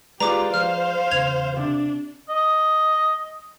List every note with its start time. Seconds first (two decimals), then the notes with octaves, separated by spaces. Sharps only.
0.20 G#3 F4 G4 G#4 B4 D5 A#5 D6
0.54 F3 C5 F5 F6
1.11 E2 C#3 G#6 F7
1.57 C3 D4
2.29 D#5